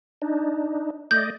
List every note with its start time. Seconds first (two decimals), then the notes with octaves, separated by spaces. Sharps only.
0.22 D4 D#4
1.11 A3 D5 D#5 G6